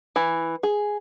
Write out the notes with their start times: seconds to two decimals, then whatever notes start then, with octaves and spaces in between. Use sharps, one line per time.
0.16 E3
0.63 G#4